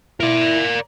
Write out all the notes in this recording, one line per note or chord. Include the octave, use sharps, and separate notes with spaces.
E4 A#4 D5